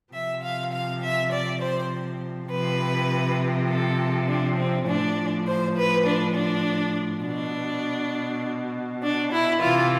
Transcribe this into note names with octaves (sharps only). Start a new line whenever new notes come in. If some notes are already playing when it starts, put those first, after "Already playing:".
C3 F3 E5
F5
F5
E5
D5
C5
C3 F3 B4
A4
D4
C4
A2 F3 D4
C5
B4
D4
D4
B2 D4
D4
E4
C3 E3 F4